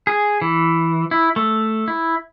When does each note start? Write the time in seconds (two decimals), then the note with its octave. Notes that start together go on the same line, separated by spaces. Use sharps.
0.07 G#4
0.42 E3
1.11 E4
1.36 A3
1.88 E4